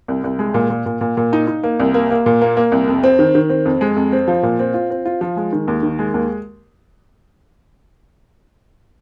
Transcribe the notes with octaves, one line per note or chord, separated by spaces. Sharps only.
C2
C2
G#3
A#2
A#2
A#2
A#2
A#2
D#4
D#4
A#3
C2
A#3
A#3
A#2
A#3
A#3
C2
F2
C4
D#3
D#3
C4
F2
G#3
F2
C4
F3
A#2
C4
F4
C4
F4
F3
G#3
D#3
D#2
D#3
G#3
D#2